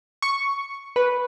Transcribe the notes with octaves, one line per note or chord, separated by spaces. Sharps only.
C#6
B4